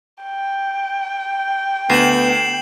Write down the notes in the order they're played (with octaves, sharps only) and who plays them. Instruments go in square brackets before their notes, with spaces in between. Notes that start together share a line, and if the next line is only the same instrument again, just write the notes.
[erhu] G5
[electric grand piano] D2 [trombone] B3 [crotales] C7 E7 F#7